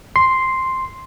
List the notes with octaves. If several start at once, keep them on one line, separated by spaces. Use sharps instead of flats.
C6 C7